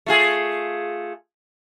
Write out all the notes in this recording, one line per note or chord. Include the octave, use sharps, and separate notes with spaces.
A3 F4 G#4